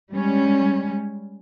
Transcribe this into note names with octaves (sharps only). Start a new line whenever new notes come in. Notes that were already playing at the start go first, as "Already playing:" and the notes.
G3 G#3 C#4